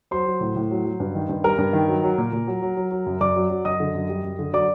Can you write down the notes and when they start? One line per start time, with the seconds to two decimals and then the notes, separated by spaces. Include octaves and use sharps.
0.11 F#3 C5 C6
0.26 F#3
0.41 A2
0.56 A2
0.71 F#3
0.85 F#3
1.00 G2
1.15 D#3
1.29 G2
1.44 G3 A#4 A#5
1.58 G2
1.73 D#3
1.88 F#3
2.03 F#3
2.18 A#2
2.33 A#2
2.47 F#3
2.62 F#3
2.77 F#3
2.91 F#3
3.06 F#2
3.21 F#2 D5 D6
3.36 F#3
3.50 F#3
3.65 F#2 D#5 D#6
3.80 D3
3.95 F#2
4.09 G3
4.24 F#2
4.39 D3
4.53 F#3 D5 D6